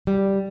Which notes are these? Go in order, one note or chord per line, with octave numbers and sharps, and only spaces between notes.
G3